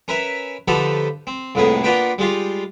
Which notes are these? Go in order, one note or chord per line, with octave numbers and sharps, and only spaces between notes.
C#4 A#4 B4 E5
D3 F3 D#4 G4 A4 B4
C4
C2 F2 A2 A#3 B3 G#4
A#3 B3 D4 F4 B4 G5
G3 G#3 F4 G4